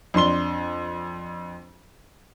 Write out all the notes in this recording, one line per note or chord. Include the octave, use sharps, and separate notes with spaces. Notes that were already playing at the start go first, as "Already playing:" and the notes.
F2 D4 C6 G7